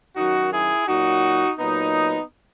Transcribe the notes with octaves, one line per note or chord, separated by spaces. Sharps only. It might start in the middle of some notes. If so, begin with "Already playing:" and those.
F#2 D#3 F#3 D#4 F#4
E4 G#4
A#2 F#3 D#4 F#4
A#2 F#3 B3 D#4